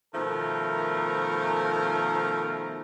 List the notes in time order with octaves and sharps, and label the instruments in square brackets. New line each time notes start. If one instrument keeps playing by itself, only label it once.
[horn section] B2 D#3 F3 A3 A#4